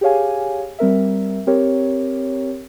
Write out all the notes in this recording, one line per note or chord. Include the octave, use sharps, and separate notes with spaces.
G4 G#4 C#5 F5 G#5
G3 C4 A#4 E5
C4 G4 A#4 C#5